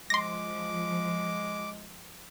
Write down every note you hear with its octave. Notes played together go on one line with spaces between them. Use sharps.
F3 G#3 C6 D6 A#6